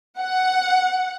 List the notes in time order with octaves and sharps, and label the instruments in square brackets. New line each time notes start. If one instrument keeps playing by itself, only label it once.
[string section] F#5